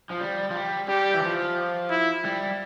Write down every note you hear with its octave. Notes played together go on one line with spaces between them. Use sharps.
F3
G3
F3
G3
G3 G4
E3
F3
E4
G3